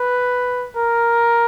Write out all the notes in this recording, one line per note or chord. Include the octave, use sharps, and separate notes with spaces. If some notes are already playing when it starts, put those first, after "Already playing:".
Already playing: B4
A#4